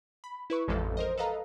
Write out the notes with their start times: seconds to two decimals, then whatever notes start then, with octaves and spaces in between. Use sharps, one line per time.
0.24 B5
0.50 E4 B4 C#6
0.68 A1 F2 E3 F3 G#3 A4
0.97 A#4 C5 D#5
1.17 A4 B4 D#5 F5 A#5